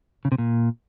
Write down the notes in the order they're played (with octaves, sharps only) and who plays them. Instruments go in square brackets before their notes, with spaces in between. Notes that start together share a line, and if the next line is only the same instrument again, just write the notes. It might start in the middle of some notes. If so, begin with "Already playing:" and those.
[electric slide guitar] C#3
C3
A#2